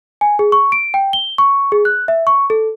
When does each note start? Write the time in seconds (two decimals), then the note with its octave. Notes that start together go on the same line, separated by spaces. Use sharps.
0.21 G#5
0.39 G#4
0.52 C#6
0.72 D7
0.94 G5
1.13 G7
1.38 C#6
1.72 G#4
1.85 F#6
2.08 E5
2.27 C#6
2.50 A4